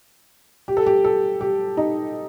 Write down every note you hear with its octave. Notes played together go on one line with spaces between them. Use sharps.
G4
A4
G4
A4
G4
D#4